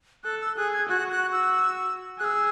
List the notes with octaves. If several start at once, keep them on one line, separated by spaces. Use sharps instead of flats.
A4 F#6
E6
G#4 F#6
G#6
F#4 F#6
F#6
E6
G#4 F#6
E6